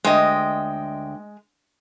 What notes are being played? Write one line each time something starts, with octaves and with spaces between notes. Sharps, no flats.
D2 G#3 D#5 G5